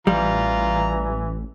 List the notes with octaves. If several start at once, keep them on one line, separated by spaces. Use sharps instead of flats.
A1 E3 G3 F4 A#5